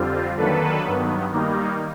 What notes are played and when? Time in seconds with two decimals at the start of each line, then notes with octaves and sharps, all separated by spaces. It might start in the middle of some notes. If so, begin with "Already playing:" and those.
Already playing: F2 D3 G3 C4 F4
0.37 D#3 F#3 A#3 D4 A4 B4
0.85 G2 D#3 F#3 B3
1.32 D#3 G3 A#3 D#4